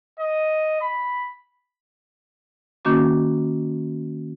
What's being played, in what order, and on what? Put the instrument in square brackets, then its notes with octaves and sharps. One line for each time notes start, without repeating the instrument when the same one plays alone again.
[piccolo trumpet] D#5
B5
[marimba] D#3 A#3 C#4 F#4 D6